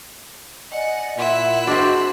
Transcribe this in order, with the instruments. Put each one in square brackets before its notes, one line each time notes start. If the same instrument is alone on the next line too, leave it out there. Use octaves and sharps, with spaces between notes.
[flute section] D5 D#5 G#5 [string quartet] F#5
[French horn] A#2 [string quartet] E4 E6 F#6 [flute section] E5 F#5 C6
[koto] C4 D4 [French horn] F#4 [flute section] G#4 D#5